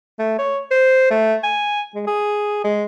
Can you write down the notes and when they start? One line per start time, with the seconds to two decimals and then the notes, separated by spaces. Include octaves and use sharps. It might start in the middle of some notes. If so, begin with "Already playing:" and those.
0.19 A3
0.38 C#5
0.71 C5
1.10 A3
1.44 G#5
1.95 G#3
2.07 G#4
2.64 G#3